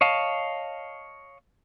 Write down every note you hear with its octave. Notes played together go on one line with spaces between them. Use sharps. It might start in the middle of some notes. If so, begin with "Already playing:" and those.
C#5 D#5 F5 A5